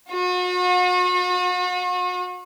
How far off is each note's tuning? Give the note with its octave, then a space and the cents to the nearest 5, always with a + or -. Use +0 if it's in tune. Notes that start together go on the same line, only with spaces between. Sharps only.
F#4 -40